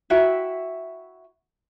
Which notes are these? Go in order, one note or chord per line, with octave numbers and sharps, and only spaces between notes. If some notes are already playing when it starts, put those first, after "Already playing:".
E4 F#4 E5 G5